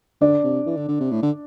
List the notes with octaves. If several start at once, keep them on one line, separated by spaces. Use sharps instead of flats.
D3 D4 D5
C3
E3
D3
D3
C3
A2
D3